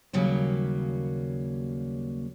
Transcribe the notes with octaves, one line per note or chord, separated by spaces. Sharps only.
D#2 C#3 F#3 G3 A#3